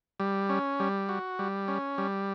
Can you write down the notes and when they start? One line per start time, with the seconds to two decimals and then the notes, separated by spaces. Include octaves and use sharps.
0.20 G3
0.49 C#4
0.80 G3
1.09 F#4
1.39 G3
1.68 C#4
1.98 G3